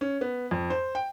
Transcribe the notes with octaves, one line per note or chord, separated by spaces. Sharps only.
C#4
B3
F2
C5
G5